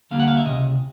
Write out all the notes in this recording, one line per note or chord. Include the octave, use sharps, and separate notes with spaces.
D2 D3 G3 A#3 F5
F#5
F5
E5
C#2 C3 D#5